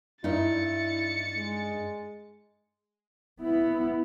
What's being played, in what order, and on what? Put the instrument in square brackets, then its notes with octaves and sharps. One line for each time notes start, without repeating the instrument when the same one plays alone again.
[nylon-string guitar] G2 D#4 [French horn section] E4 [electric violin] A6 C#7
[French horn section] G#3
[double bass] B3 E4